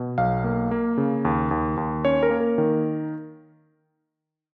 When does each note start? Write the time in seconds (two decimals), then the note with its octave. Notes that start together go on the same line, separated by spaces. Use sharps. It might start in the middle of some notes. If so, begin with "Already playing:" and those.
Already playing: B2
0.18 B1 F5
0.44 A#3
0.71 A#3
0.98 C#3
1.25 D#2
1.51 D#2
1.77 D#2
2.05 C#4 C#5
2.23 A#4
2.30 A#3
2.40 A#4
2.58 D#3